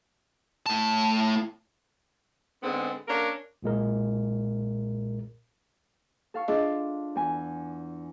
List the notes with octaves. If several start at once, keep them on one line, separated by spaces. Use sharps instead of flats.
A2 A5
G#2 D3 G#3 B3 C4
A#3 C#4 D4 A#4
B1 A#2 G#3 A#4
A4 F5 C#6
D4 F4 G#4 D#5
E2 G#5